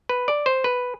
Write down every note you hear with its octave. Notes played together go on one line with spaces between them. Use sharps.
B4
D5
C5
B4